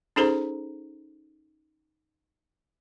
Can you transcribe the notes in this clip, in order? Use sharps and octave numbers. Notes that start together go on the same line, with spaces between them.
C#4 D#4 G#4 A4 C5 A#5